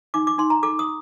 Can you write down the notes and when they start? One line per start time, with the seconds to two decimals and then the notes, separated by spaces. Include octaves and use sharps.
0.14 D#4 D6
0.27 D6
0.38 D#4 C6
0.50 A#5
0.63 A4 D6
0.79 D#6